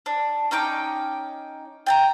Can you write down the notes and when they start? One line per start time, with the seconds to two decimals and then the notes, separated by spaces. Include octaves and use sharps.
0.06 D4
0.51 C#4 D#4 G5 D6
1.86 G5 A5 A#5